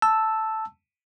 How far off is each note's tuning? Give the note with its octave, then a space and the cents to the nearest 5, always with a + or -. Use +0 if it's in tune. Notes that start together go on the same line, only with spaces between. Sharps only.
A5 +0 E6 +0